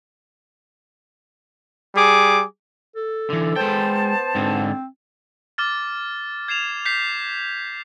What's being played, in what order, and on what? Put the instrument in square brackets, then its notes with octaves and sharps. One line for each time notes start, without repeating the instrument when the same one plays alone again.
[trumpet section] G3 G#4 D6
[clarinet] A4
[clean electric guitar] D3 E3
[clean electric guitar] G#3 G5 [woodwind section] B3 C5 A5
[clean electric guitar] G#2 D3 [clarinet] C4
[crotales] D6 F6 A6
G#6 C7 E7 F7
G6 B6 C7